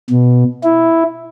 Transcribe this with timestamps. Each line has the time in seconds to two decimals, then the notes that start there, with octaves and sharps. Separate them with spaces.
0.10 B2
0.64 E4